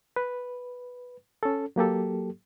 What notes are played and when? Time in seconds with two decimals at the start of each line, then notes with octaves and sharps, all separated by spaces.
0.16 B4
1.43 C#4 A4
1.76 F#3 A#3 G4 A4